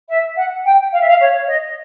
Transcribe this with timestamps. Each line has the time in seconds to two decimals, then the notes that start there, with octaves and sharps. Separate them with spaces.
0.09 E5
0.36 F#5
0.64 G5
0.92 F5
1.01 E5
1.08 F5
1.20 C#5
1.47 D#5